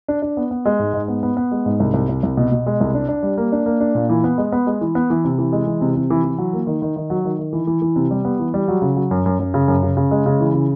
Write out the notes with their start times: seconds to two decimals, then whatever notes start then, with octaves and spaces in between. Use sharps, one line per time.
0.08 D4
0.22 D4
0.37 B3
0.51 B3
0.65 G#3
0.79 G#2
0.93 G#2
1.08 B3
1.23 B3
1.37 B3
1.51 G#3
1.66 G#2
1.80 C2
1.94 C2
2.09 C2
2.23 C2
2.37 B2
2.52 B2
2.66 G#3
2.80 C2
2.95 D4
3.09 D4
3.23 G3
3.38 A#3
3.52 D4
3.66 A#3
3.80 D4
3.95 A#2
4.09 E3
4.24 B3
4.38 G#3
4.52 B3
4.67 G#3
4.81 E3
4.95 B3
5.10 E3
5.25 C3
5.38 E3
5.52 G#3
5.67 E3
5.81 C3
5.96 C3
6.10 E3
6.24 E3
6.38 F#3
6.53 A#3
6.67 D#3
6.82 D#3
6.96 D#3
7.10 F#3
7.25 D#3
7.39 D#3
7.53 E3
7.67 E3
7.82 E3
7.96 C3
8.11 G3
8.25 B3
8.39 E3
8.54 G3
8.68 F#3
8.82 C#3
8.97 F#3
9.11 F#2
9.26 F#2
9.39 F#2
9.54 C#3
9.68 F#2
9.83 C#3
9.97 C#3
10.11 G#3
10.26 C#3
10.40 E3
10.54 C#3